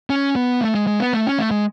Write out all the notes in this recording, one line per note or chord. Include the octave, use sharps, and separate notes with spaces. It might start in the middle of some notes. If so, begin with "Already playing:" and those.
C#4
B3
A3
G#3
G#3
B3
A3
C#4
A3
G#3